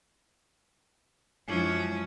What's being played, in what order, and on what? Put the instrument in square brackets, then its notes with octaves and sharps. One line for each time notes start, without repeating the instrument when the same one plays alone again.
[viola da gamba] F#2 F3 C#4 [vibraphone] G#3 D4 E4